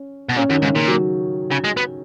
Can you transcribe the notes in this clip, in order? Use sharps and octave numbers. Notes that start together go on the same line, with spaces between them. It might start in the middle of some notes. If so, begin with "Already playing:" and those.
Already playing: C#4
B2
A#2 C#4
F#2 D#3
G#2 C#3
A#2 C#3
F#3
C#3
G#3
B3